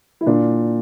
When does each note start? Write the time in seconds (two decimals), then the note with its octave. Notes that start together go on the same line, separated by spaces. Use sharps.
0.21 E4
0.26 A#2 D4